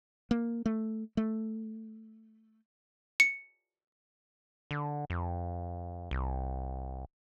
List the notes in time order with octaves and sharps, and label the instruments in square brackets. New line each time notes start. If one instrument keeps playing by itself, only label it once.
[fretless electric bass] A#3
A3
A3
[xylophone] C#7
[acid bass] D3
F2
C2